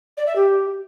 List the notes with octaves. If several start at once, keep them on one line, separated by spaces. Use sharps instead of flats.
D5
E5
G4